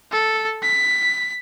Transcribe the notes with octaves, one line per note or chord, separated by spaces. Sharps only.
A4
B6